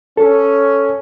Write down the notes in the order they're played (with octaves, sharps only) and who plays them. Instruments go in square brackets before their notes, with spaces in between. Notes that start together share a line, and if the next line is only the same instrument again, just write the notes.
[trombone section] C#4 [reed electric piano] A4